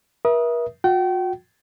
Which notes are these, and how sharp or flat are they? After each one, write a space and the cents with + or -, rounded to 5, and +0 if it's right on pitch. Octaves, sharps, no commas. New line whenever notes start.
A#4 +45 E5 +0 D#6 +0
F#4 -45 G5 -35